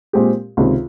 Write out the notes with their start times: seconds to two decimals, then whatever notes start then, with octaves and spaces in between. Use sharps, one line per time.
0.13 A#2 G#3 C4 G4
0.57 C#2 C3 D#3